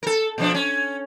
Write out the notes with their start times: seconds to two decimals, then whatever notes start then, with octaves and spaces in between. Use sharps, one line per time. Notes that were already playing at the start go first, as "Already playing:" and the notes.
0.03 A4 A#4
0.38 B2 F3 D4
0.55 C#4